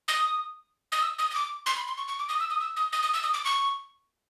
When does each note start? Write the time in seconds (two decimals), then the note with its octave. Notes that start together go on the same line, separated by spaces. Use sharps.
0.08 D#6
0.92 D#6
1.02 E6
1.19 D#6
1.31 D#6
1.35 D6
1.66 C6
1.77 B5
1.88 C6
1.97 C#6
2.08 C#6
2.19 D6
2.29 D#6
2.40 E6
2.50 D#6
2.60 E6
2.76 D#6
2.93 D#6
3.03 D#6
3.14 E6
3.23 D#6
3.34 D6
3.45 C#6